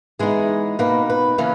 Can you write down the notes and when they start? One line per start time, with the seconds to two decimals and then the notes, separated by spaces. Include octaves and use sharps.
0.19 E3 G#3 B3 D#4 G#4
0.79 B2 A#3 D#4 B4
1.10 B4
1.38 C#3 E3 A#3 C#4